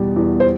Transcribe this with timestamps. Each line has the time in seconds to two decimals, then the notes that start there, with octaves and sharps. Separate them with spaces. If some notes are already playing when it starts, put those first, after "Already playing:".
Already playing: E2 B2 G3
0.16 E2
0.40 C5